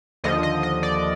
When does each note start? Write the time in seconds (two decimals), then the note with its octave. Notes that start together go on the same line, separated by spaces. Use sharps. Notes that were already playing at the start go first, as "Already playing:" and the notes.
0.24 D#2 D3 F3 D#5
0.43 D#5
0.63 D#5
0.83 D5